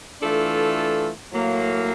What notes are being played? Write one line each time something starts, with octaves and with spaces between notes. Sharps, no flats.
E3 A3 D4 F4 A4
A2 F#3 A#3